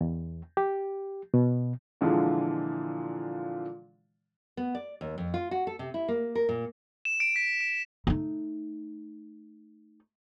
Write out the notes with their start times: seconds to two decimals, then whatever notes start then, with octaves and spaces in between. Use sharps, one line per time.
0.01 E2
0.57 G4
1.34 B2
2.01 A#2 D3 E3 F3 G#3
4.57 B3
4.75 D5
5.01 D#2
5.18 F2
5.34 F4
5.51 F#4
5.67 A4
5.79 C3
5.94 E4
6.08 A#3
6.35 A#4
6.49 A#2
7.05 E7
7.20 D7
7.36 B6
7.61 D7
8.07 A3 D#4